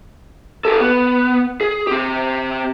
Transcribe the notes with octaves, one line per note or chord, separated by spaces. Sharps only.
G4 A4
B3
G#4
C4 G4